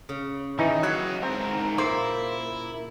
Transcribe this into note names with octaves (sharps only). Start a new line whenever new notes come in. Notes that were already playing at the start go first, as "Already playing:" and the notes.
C#3
D#3 E3 D#4
F#3 E4 D#5 F5 F#5
G#2 C4 A#4
A#2 A#3 E4 C5